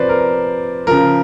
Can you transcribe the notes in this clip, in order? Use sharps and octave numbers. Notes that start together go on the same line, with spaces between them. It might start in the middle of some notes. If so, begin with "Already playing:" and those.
Already playing: C3 F3 B4 C5 D5
A#4
C#3 F3 A#4